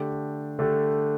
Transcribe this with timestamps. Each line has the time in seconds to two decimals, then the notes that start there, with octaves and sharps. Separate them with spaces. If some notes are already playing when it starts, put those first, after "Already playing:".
Already playing: D3 A3 D4 G4
0.59 D3 A3 D4 G4